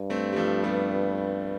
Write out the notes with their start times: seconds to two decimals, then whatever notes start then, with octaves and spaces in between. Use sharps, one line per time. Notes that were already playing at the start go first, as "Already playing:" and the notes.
Already playing: G2
0.10 A3 C4
0.32 G3
0.36 F3 A3
0.63 G3 B3